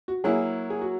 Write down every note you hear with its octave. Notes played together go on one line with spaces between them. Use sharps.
F#4
F#3 A#3 E4 G#4
G#4
F#4